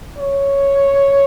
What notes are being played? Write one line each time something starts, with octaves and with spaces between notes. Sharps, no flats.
C#5